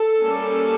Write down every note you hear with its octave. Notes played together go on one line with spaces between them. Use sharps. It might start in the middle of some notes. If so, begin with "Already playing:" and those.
Already playing: A4
G3 A#3 C#4